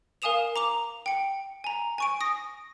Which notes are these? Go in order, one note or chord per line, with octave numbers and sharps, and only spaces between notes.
A#4 F5 G#5 D#6 E7 F7
A#5 D6 F7
G5 C#7
G#5 A#5
G#5 C#6 D7
D#6 A#6